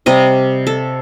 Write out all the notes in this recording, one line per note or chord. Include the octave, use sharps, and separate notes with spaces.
C3 G3 D#5
A4